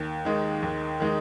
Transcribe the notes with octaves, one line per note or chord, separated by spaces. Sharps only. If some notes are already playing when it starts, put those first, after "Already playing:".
Already playing: D#2
D#3 G#3 D#4
D#2
D#3 G#3 D#4